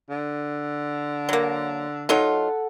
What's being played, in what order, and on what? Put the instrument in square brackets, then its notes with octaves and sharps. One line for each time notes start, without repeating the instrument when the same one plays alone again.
[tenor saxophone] D3
[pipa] F#3 A#3
[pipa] F#3 D#4 F4 [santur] A4 F#5 A5